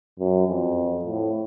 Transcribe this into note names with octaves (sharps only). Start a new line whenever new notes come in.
F#2
F2
A2